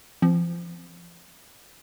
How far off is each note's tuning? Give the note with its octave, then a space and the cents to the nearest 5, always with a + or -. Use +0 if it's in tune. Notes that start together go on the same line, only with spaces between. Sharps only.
F3 -20 C4 +0